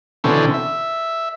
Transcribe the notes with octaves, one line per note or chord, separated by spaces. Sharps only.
B2 D3 E3 C4 C#4 A4
E5